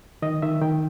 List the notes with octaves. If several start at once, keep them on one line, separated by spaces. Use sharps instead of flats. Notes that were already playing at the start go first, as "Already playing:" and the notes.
D#3 D#5
D#3 E5
D#3 G5